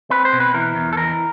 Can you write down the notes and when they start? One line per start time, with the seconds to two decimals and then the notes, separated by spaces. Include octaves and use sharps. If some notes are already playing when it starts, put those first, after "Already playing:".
0.10 C4 B4
0.25 C5
0.33 B2
0.40 B4
0.54 E3 A#4
0.75 E2
0.93 A4
0.97 E3 A#4